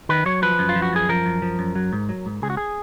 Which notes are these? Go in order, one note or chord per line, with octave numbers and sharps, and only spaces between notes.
D#3 B4
F#3 C#5
F3 B4
F#2
F4
F3
F#4
F#2 G#4
F3 A#4
F#2
F3
F#2
F#3
G#2
F#3
G#2
C#2 G#4
F#4
G#4